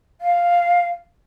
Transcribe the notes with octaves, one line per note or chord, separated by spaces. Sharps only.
F5